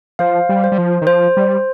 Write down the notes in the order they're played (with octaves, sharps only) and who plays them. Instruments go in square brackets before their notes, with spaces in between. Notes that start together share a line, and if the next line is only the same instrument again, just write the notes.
[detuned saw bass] F3 [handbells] C5 F5
[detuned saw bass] G3
[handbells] C5
[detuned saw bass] G3
F3
D#3
[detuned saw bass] F3 [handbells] C5
[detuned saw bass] G3